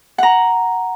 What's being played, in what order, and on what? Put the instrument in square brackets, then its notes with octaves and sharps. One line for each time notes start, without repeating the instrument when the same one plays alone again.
[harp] F#5 A#5